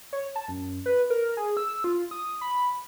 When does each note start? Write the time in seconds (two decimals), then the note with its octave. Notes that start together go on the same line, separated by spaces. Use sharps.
0.13 C#5
0.36 A5
0.48 F#2
0.86 B4
1.10 A#4
1.37 G#4
1.57 E6
1.84 F4
2.11 D#6
2.41 B5